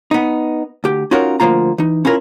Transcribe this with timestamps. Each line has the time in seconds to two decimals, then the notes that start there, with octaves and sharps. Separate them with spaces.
0.11 B3 D#4
0.84 D2 G4
1.11 C#4 D#4 F4 F#4 A#4
1.40 D2 A2 F3 A#3 F4 A#5
1.78 E3 D#4
2.05 C#4 E4 F4 A#4